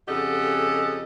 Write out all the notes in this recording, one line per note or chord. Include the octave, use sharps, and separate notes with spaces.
F2 C#3 G4 A4 D#5 F#5